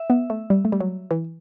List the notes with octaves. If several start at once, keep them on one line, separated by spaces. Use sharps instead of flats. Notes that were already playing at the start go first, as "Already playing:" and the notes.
Already playing: E5
B3
A3
G3
A3
G3
F#3
E3